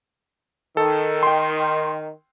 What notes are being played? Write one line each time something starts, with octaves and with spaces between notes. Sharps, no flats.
D#3 A4
G5 C6